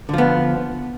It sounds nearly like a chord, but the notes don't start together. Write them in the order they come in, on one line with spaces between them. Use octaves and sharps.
D3 F3 B3